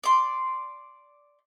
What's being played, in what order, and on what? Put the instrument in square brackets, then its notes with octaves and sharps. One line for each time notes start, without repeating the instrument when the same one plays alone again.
[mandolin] D5 C6